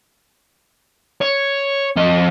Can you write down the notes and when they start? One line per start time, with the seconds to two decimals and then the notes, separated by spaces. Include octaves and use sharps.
1.21 C#5
1.97 F2 D#5